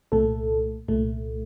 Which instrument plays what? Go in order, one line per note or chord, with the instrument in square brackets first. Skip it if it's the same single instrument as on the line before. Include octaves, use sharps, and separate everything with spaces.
[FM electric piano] C2 A#2 A3 A4
C2 A#2 A3